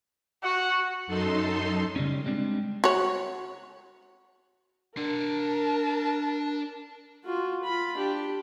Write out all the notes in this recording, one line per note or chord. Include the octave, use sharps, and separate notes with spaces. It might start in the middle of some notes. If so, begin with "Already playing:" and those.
F#4 F#5
F#2 D#4 A4 C6
C#3 G3 C#4
G3 G#3 C4 D4
F#4 C#5
D4 A#4 A5 C6
F4 F#4
F4 B5
D4 G4